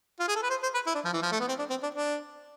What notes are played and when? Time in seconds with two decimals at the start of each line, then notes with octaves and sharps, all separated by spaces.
0.20 F4
0.28 G#4
0.35 A4
0.42 B4
0.50 C5
0.63 C5
0.74 B4
0.86 E4
0.95 D4
1.05 F3
1.13 E3
1.22 F3
1.32 A3
1.40 B3
1.48 C4
1.59 D4
1.70 C4
1.83 D4
1.95 D4